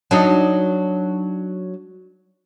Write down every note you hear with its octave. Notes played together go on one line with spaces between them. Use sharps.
F#3 D4 D#4